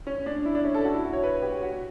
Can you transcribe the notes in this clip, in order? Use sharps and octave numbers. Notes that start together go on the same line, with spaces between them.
C#4
D4
E4
D4
C#4
A4
F#4
E4
F#4
C#5
B4
G4
F#4